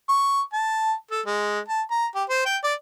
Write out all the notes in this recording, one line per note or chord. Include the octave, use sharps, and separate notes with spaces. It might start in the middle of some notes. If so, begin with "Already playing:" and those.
C#6
A5
A4
G#3
A5
A#5
G4
C5
G5
D5